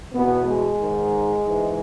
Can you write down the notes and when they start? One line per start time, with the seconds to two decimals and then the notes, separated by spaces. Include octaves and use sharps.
0.14 E2 B2 B3
0.46 G#3
0.78 G#2 D#3
1.44 G#2 E3